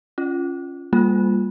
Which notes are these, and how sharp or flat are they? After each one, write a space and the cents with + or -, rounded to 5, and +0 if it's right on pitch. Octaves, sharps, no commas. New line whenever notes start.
C#4 +0 F4 -10
G3 +15 A#3 +0 F4 +5